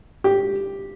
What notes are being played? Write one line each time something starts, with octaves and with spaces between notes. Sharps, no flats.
G4